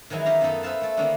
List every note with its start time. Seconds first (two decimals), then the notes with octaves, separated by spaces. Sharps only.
0.10 D#3 E3 F#3 G#3 E4
0.26 D#4 G4 F5 A#5
0.41 F#2 B3 C#4 D#4 A4 B4
0.63 A4 B4 C5 E5 F5 A5
0.81 A3 A4
0.97 D3 D#3 A#3 B3 C#4 D4